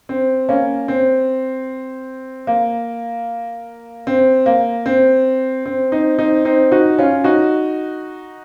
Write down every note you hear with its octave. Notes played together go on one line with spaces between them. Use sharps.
C4
A#3 C#4
C4
A#3
C4
A#3
C4
C4
C4 D#4
C4 D#4
C4 D#4
D#4 F#4
C#4 F4
D#4 F#4